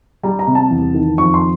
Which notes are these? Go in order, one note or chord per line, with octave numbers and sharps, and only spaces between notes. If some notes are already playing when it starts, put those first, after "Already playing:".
G3 A#5
A#5
C3
A5
E2
D#3
F2 C#6
C6